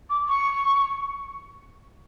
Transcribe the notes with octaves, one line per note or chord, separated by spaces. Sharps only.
D6
C#6